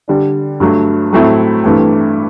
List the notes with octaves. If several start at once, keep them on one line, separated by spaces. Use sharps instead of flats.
D3 G3 D4
G2 F#3 A3
A2 F#3 A3 C4 E4
G2 E3 A3 C4